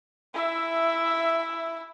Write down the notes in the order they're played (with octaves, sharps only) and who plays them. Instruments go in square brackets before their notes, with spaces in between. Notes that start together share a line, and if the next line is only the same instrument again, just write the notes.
[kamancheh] E4 E5